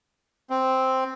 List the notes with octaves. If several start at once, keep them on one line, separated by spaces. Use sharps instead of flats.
C4